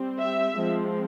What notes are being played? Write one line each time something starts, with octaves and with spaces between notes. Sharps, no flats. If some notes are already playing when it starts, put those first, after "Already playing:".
Already playing: G3 C4
E5
F3 G#3 C4